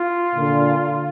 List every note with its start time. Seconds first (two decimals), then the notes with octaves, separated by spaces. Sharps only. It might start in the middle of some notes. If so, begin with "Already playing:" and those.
Already playing: F4
0.34 A#2 D3